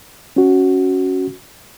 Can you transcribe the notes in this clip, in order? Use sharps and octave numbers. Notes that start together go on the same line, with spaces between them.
C#4 F#4